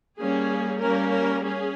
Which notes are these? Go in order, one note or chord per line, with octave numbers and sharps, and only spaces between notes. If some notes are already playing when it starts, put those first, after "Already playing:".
G3 A#3 C#4 G#4
G3 A#3 C#4 A#4
A#4
C#4 G#4